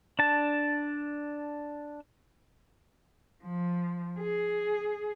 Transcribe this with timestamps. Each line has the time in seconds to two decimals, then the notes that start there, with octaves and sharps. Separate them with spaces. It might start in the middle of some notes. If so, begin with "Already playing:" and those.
0.19 D4 A5
3.44 F3
4.20 G#4